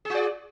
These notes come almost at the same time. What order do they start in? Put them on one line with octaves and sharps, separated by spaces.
G#4 F4 D5